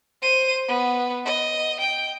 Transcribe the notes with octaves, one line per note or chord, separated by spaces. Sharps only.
C5 D#7
B3
D#5
G5